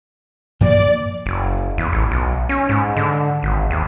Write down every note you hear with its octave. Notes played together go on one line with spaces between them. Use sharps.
G2 F3 A#3 D5
F#1
E2
A1
B1
C#4
G#2
D3
G#1
D#2